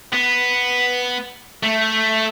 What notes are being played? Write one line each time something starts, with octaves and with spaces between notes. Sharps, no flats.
B3
A3